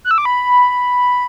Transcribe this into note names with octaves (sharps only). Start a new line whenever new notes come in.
F#6
E6
D6
B5